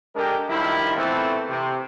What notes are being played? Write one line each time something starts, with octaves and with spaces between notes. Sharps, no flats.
G#3 D4 G4 A4 A#4
G2 D#3 F3 E4
A#2 E3 A3 B3 C4 A4
C3